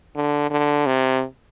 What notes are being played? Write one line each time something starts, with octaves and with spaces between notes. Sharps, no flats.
D3
D3
C3